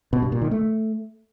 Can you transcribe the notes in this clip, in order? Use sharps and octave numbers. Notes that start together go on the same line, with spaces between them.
B2
G2
A#2
D#3
A3